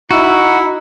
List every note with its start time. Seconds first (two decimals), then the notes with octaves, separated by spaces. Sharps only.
0.11 D#4 E4 F#4